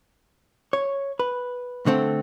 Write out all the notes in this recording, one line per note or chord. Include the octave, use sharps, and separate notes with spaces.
C#5
B4
D3 A3 C4